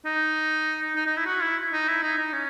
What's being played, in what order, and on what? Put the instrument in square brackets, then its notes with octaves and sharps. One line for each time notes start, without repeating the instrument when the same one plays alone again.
[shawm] D#4
D#4
D#4
E4
F#4
E4
D#4
E4
D#4
D#4
C#4